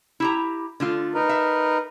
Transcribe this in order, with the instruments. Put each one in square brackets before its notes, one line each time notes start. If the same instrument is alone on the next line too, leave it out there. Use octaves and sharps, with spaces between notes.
[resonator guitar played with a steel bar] E4 G4 A#5
D3 A3 F4
[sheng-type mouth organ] D#4 A#4 B4
[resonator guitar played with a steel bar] E5